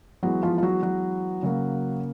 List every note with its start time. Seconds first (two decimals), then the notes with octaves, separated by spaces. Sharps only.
0.23 E3 F#3 G#3 B3 F#4
0.43 F3 F4
0.58 F4
0.63 F#3 F#4
0.83 F#3 F#4
1.43 C#3 F#3 A#3